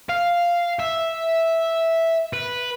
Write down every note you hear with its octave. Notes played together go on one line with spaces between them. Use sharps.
F5
E5
B4